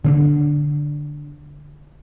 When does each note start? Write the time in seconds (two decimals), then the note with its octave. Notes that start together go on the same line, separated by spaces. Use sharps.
0.05 D3 C4 D4